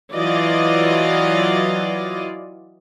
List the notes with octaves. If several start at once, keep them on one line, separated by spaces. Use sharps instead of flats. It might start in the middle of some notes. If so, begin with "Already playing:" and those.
E3 F#3 F4 D5 D#5